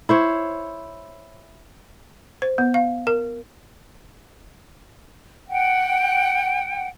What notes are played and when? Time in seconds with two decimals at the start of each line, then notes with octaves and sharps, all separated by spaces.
0.09 E4 C5 C#5
2.42 C5
2.58 B3
2.74 F5
3.07 A#4
5.48 F#5 G5